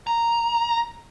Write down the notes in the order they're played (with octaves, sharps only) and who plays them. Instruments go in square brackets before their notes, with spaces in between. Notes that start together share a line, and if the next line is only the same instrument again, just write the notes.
[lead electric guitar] A#5